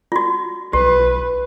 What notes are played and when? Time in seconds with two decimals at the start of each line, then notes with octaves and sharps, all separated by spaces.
0.12 F4 F#4
0.73 B1 G4 B4